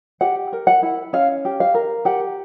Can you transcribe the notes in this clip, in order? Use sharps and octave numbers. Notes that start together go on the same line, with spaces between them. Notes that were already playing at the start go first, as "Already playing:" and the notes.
G4 F#5
A#4
F#5
E4
C#4 F5
G4
F5
A#4
G4 F#5